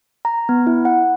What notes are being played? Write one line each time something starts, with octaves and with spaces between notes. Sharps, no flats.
A#5
B3
E4
F#5